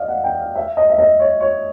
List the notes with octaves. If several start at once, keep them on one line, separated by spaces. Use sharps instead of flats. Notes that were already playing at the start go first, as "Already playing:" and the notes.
Already playing: D5 D#5 F5
F#5
G5
F5
E5
D#5
E5
D#5
C#5
C#5